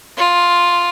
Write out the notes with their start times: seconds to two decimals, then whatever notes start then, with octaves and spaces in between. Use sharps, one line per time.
0.17 F4